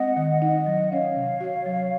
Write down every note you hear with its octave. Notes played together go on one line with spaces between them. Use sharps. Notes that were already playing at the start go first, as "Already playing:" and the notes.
Already playing: G#3 C4 D#5 F#5
D#3
D#4 D#5 F#5
F#3
C#4 C#5 F5
C3
F#4
F#3